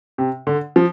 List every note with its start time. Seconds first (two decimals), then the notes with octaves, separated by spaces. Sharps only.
0.18 C3
0.47 D3
0.76 F3